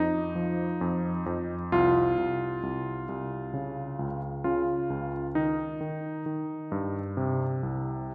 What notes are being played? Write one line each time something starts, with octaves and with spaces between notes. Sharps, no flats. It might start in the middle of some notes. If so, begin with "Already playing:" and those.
Already playing: F2 D#4
F3
F2
F2
C2 F4
C2
C2
C2
C#3
C#2
C#3 F4
C#2
D#3 D#4
D#3
D#3
G2
C3
C2